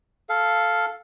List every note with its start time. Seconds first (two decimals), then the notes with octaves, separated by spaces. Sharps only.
0.29 A4 F5